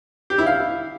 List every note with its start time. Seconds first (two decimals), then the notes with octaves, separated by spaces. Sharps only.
0.30 G4
0.38 E4
0.47 F5